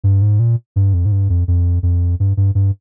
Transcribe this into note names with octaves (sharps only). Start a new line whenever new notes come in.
G2
G#2
A#2
G2
F2
G#2
G2
F2
F2
F2
G2
G2
G2